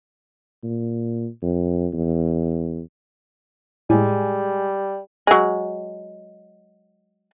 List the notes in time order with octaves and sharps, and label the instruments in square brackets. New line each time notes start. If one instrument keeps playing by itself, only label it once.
[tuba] A#2
F2
E2
[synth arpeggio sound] A2 [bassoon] G3 [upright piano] G#3 G#5
[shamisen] F#3 G#3